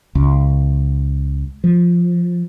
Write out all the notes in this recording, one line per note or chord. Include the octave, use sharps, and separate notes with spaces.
C#2
F3